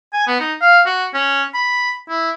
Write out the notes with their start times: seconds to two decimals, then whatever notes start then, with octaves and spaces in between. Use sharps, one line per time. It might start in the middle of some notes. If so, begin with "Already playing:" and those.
0.13 G#5
0.27 B3
0.40 D#4
0.61 F5
0.86 F#4
1.14 C#4
1.54 B5
2.09 E4